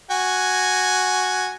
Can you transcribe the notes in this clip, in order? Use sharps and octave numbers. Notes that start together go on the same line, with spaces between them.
F#4 G#5